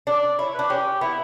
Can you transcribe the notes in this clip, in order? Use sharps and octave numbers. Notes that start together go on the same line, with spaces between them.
D4 D5
E4 C#5
D4 B4
C#4 G4
B3 E4